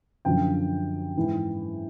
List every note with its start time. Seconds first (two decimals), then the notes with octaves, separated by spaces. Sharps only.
0.25 F#2 D3 F3 G5
1.17 G#2 E3